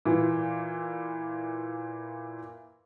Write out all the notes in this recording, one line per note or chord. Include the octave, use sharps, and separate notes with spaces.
A#2 E3